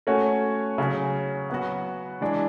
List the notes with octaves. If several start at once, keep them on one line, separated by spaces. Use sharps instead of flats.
A3 C#4 F#4 C#5
C#3 F#3 C#4
F#3 B3 F#4
E3 G#3 D4